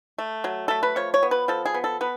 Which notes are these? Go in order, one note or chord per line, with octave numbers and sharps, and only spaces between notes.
A3
F#3
A3 A4
B4
F3 C#5
C#5
B3
B4
F3 A4
G#4
B3
A4
B3 B4